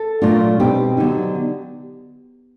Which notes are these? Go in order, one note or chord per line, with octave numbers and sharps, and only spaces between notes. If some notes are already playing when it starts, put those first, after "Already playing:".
Already playing: A4
A#2 F#3 A3 D4 F4
B2 G#3 C4 D#4 G4
D3 F#3 B3 D#4